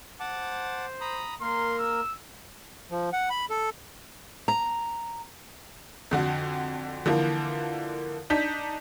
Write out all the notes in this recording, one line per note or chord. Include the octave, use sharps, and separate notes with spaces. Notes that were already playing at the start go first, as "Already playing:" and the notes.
C5 F#5 A5 D6
A#5 B5 D#6
A#3 A#4 C6
E6
F3
F#5
B5
A4
A#5
F2 D3 F#4
D3 E3 F3 A#3
D4 D#4 G6 B6